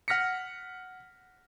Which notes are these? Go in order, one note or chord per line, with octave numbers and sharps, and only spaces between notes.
F#5 F6 A#6 B6 C#7